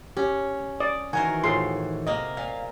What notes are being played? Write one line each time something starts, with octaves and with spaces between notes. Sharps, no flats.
C#4 G4
D5 D#6
D#3 E3 F#4 A#4 C5 G#5
A2 F4 G#4 C6
C3 A#3 D#5
A#2 F5